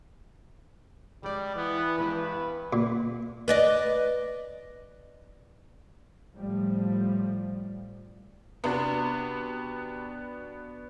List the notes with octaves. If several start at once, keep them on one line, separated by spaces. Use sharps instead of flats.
G3 G#3 D5
E3 B3
G2 G#3 B3 E4 B4
A#2
B4 D5 D#5
A2 F3 G3
C3 B3 D4 F#4